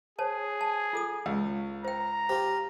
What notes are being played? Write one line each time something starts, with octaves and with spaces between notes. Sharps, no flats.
G#4 C5 C#5 A5
A5
F4 A4 D#6
C#2
C5 G5 A#5
F4 G4 C5